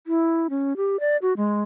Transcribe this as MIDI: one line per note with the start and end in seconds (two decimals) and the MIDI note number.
0.07 0.47 64
0.50 0.76 61
0.77 1.00 67
1.00 1.17 74
1.22 1.33 66
1.37 1.62 56